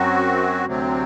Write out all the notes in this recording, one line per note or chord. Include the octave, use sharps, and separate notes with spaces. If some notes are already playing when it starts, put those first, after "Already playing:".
Already playing: F#2 F#3 C4 F#4
D2 C3 F#3 C4